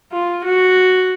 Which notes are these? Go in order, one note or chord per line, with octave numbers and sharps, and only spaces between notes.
F4
F#4